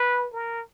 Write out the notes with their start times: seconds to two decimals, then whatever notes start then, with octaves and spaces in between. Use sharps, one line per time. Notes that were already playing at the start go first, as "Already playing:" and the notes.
Already playing: B4
0.33 A#4